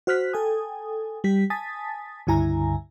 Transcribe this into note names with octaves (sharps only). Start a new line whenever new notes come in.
F#4 C5 F6 F#6 B6
A4 G5 G#5 D#6
G3 G4 B6
G#5 A5 D#6 A6 B6
C#2 G2 D3 E4 G#5 A#5